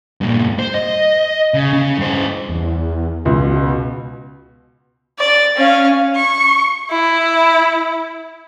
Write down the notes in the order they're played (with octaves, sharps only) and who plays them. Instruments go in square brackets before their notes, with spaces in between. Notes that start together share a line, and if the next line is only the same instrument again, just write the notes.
[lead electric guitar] G2 A#2
C5
D#5
C#3
C#3
G2 C5
[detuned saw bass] E2
[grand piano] C#2 [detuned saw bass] B2
[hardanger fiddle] D5
C#4 F5
[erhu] C#6
E4